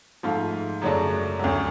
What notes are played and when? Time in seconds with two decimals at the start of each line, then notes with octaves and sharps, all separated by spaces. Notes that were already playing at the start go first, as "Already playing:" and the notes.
0.23 G#2 F3 A3 F4
0.81 F#2 C#3 F#3 A3 D4
1.39 D2 D3 F#3